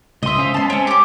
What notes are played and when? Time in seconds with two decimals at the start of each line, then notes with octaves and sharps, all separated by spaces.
0.23 C#2 D#5 E5 C6
0.38 C#4 C5 F5
0.54 G#3 B3 C#4 A5 C6
0.70 C4 C#4 C#5
0.87 G4 D6